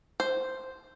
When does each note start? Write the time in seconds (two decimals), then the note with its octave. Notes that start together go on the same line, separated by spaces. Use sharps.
0.20 C5